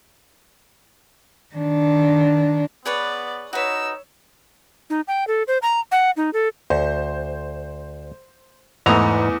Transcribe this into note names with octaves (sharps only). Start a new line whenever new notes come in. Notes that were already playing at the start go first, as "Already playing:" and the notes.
D#3 D4
B3 G#4 B4 C#5 D5
D#4 F#4 B4 C#5 E6
D#4
G5
A4
C5
A#5
F#5
D#4
A4
D2 C5
E2 G#2 E3 A3 A#5 D#6